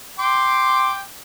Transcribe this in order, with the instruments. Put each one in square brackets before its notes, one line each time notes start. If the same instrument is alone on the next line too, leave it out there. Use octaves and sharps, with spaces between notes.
[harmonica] G5 C6 D6